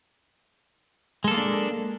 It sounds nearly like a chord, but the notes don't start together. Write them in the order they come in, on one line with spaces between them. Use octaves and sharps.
G#3 A4 A#3 F4 D4